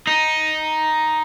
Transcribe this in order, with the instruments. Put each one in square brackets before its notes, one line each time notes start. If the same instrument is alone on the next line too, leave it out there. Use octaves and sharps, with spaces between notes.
[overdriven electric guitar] D#4